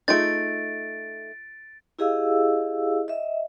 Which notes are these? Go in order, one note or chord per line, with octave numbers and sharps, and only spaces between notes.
A3 D#4 F4 G#4 C6 A6 D7
E4 G4 G#4 D#5 F5 E6
D#5 E5